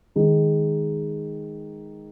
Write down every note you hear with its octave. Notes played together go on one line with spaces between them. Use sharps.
D#3 G#3 D#4